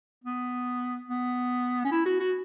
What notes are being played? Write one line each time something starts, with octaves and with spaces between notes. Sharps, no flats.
B3
B3
C#4
E4
F#4
F#4